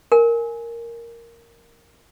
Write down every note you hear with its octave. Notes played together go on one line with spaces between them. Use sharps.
A#4 G#5